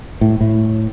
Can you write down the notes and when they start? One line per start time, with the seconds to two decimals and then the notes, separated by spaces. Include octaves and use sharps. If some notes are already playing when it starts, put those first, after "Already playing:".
0.21 A2
0.41 A2